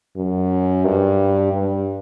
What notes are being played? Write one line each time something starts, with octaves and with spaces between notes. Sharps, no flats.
F#2
G2
G2